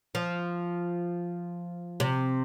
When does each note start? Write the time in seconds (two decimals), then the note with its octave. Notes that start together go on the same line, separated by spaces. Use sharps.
0.15 F3
2.00 C3